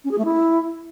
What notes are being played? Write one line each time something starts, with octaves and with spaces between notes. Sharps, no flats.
C#4
G#4
A3
E4